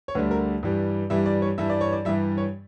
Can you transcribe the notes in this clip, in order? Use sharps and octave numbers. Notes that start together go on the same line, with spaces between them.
C#5
D2 D3 G3 B4
A#4
G2 E3 G3
G2 E3 G3 E5
D5
C#5
G2 E3 G3 E5
D5
C#5
D5
G2 E3 G3 E5
C#5